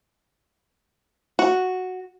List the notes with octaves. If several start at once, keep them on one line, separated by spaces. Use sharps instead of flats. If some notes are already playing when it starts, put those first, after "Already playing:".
F#4